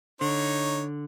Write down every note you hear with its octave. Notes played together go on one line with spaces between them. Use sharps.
D3 D#4 C#5